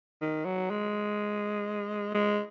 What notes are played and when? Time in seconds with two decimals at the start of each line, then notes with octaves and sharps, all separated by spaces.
0.21 D#3
0.45 F#3
0.70 G#3
2.15 G#3